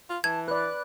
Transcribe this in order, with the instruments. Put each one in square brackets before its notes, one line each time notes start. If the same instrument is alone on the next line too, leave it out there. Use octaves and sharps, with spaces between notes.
[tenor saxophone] F4
[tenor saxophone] E3 [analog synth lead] A5 [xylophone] G#6
[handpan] B4 D5 [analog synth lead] F#6